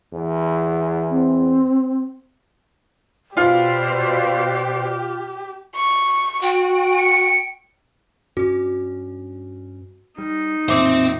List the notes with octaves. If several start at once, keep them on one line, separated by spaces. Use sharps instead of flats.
E2
C4
B2 F4 G4 B4 C5 D5 F5
C#6
F#4 G5
C#7
G2 C#4 F#4
G3 D#4
A1 F2 A#2 C4 C5 E5 D6